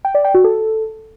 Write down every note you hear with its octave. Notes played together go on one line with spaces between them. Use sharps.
G5
D5
G5
F#4
A4